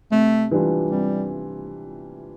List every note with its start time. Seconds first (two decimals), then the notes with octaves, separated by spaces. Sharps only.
0.11 C3 A3
0.51 E3 G3 D4 F4
0.91 C3 G3